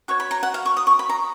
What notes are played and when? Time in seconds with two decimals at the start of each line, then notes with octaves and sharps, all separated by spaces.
0.08 F#4 C#5 C#6
0.20 B5
0.31 A#5
0.43 F#5
0.54 F5
0.66 C#6
0.77 D#6
0.87 C#6
0.99 B5
1.09 A#5